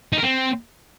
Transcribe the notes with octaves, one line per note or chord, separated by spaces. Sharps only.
D#4
A#4
C4